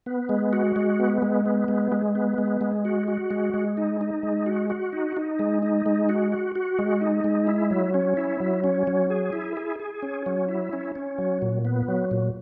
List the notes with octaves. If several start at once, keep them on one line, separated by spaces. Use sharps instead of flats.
B3
G#3
F#4
G#3
B3
G#3
B3
G#3
G#3
B3
G#3
G#3
F#4
F#4
G#3
G#3
D#4
D#4
G#3
F#4
F#4
D#4
D#4
G#3
D#4
G#3
F#4
F#4
F#4
G#3
D#4
G#3
E4
F#3
C#4
E4
F#3
C#4
F#3
G#4
E4
G#4
G#4
C#4
F#3
E4
C#4
C#4
F#3
A#2
B3
F#3
A#2